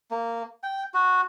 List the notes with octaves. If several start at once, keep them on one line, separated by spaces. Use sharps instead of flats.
A#3
G5
F#4